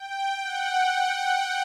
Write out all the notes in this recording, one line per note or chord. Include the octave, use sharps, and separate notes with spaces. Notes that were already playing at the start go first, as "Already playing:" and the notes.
Already playing: G5
F#5